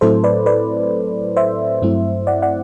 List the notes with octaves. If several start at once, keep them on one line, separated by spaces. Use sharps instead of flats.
A2 F#3 A3 C4 E4 A4 C5
B4 D5
B4 D5
C5 E5
G2 F#3 A3 C4 E4
D5 F#5
D5 F#5